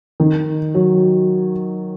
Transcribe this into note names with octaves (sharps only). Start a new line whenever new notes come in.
D#3
F#3